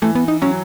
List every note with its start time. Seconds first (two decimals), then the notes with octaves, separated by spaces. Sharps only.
0.02 E3 A3
0.15 B3
0.28 D#4
0.42 F#3 C#4